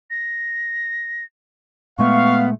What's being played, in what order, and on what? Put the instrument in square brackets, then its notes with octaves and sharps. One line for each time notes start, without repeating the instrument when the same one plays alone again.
[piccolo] A#6
[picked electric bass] A#2 G#3 A3 [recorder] B3 [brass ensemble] F5 [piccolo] C#6